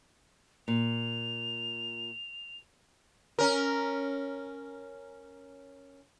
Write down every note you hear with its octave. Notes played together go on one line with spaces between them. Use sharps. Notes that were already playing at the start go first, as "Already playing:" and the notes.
A#2 F7
C#4 A#4